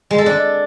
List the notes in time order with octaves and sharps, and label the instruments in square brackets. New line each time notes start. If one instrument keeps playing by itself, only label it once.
[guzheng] G#3
A4
D4